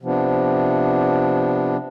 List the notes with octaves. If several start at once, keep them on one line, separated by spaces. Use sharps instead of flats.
C3 F3 B3 D4